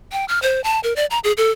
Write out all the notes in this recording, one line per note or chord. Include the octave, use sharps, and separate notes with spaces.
G5
F6
C5
A5
A#4
D5
A#5
G#4
A4